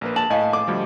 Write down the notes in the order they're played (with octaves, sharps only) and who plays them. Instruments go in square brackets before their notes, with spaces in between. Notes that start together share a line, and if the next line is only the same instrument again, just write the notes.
[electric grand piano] A#1 A#3 B4
[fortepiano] A5 [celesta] F#7
[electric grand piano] A2 G#5 [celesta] D#5 F5
[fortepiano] D6
[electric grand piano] D2 F3 G3